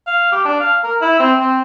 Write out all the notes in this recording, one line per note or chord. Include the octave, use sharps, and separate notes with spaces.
F5
G4
D4
F5
A#4
E4
C4
C4